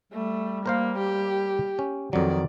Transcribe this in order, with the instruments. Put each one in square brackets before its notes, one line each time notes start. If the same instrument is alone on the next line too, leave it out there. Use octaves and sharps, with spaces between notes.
[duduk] G3 [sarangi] A3
[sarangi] A#3 [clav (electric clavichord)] A#4 C5 F5
[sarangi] G4
[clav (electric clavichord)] C#4
[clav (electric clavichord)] F2 F#3 [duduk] D#3 [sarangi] D5